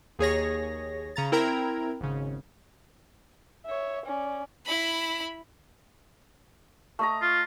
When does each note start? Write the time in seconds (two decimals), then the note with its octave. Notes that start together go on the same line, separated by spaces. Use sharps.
0.19 D#2 G#4 C#5 A#6
1.16 C#3 A#5 A6
1.32 C4 E4 A#4 G5 A#5 G#6
2.00 G#1 C#3
3.65 C#5 E5
4.06 C#4 D5
4.66 E4 B5
6.99 A3 D#5 A#5
7.22 F4